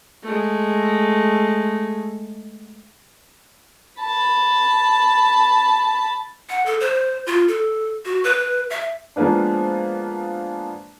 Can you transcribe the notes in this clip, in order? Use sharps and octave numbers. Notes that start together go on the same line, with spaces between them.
G#3 A3
A5 B5
F#5
A4
C5
F4
A4
F#4
B4
E5
F3 G#3 A#3 B3 D4